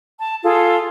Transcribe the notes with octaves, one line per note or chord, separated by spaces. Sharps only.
A5
F4 G#4 A4